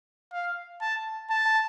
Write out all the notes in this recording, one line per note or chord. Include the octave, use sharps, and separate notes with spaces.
F5
A5
A5